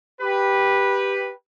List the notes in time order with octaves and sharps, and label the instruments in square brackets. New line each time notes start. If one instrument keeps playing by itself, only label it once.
[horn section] G4 B4